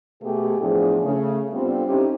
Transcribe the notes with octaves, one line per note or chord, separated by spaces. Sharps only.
B2 A3 G4 G#4
E2 A2 F3 D4 G#4
C#3 A3
G3 B3 C4 D4 F4 A4
C4 C#4 D#4 E4 G4